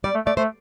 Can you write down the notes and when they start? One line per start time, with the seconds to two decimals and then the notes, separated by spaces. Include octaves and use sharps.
0.04 G3 D5
0.15 A3
0.26 A3 D5
0.37 A3 C5